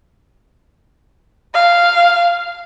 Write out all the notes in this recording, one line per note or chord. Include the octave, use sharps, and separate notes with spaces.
F5